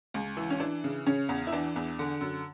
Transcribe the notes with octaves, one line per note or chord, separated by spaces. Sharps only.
C#2
E3
C#4
E3 D4
C#3
C#3 C#4
E2
E4
E3 D4
E2
D3
F#2